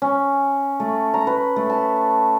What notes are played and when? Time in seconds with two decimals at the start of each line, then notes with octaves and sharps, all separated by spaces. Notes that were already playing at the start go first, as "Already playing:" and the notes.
0.02 C#4
0.80 A3
1.14 A#5
1.27 B4
1.56 A3
1.69 A5